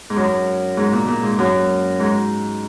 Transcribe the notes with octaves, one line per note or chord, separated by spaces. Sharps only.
G#2
F#2
G#2
A#2
A#2
G#2
F#2
G#2